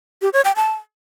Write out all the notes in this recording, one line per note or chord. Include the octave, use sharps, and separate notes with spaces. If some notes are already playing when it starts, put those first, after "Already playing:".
G4
C#5
G5
A5